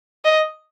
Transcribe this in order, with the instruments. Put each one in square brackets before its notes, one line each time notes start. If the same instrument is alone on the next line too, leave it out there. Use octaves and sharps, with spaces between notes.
[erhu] D#5